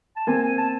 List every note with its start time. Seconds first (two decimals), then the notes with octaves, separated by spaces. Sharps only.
0.16 A5
0.27 A#3 C4 G#5
0.43 G#5
0.58 A5